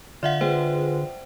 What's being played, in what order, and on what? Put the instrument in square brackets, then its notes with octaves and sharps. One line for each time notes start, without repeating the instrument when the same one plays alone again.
[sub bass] D3 [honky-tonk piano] F4 [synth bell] D5 E5 F#5
[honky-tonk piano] G#3 [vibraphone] F4 B4 [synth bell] C5 G5